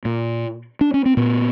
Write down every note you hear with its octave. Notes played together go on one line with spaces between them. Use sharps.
A#2
D4
C#4
C4
A#2 B3